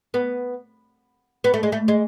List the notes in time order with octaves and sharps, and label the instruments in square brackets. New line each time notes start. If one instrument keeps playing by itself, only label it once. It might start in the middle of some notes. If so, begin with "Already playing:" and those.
[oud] B3
B3
A3
G#3
A3
G#3